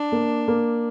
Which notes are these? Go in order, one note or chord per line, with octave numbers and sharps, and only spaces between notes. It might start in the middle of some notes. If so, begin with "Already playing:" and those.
Already playing: D4
A#3
A#3